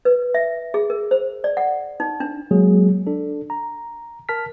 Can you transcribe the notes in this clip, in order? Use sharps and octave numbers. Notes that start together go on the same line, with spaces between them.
B4
E5
G#4
A#4
C5
D5
F#5
D#4
D4
F#3 G#3 A#3 G#4
D4 A4
A#5
A#4 A5 F6 B6